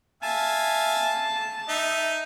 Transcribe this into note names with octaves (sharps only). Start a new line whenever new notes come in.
E5 F5 G#5 A5
D#4 E5